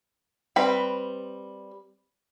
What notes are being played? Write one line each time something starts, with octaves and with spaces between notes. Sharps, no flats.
G3 C4 B4 B5